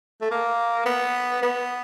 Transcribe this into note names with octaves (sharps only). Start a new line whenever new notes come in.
A3
A#3
B3
B3